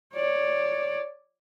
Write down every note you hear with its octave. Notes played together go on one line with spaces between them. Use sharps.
C#5 D5